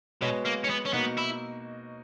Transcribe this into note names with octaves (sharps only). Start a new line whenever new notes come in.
B2 G#3 B3 F#4 C#5
A#3
C#4
B3
C#4
B2 A#3 B3 D#4 F#4
E4